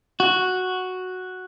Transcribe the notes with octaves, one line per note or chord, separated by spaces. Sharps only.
F#4